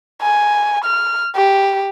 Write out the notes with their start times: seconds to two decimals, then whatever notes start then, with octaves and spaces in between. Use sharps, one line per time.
0.22 G#5
0.85 F6
1.36 G4